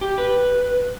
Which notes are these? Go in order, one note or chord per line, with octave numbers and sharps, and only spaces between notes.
G4
B4